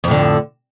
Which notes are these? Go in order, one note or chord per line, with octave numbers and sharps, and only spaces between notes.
F2 A2 D3